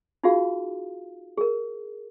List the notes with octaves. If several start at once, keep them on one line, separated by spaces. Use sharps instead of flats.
D#4 F4 F#4 G#4 F5
G#4 A#4